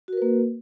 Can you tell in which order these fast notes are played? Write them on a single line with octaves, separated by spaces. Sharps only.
F#4 A#4 B4 A#3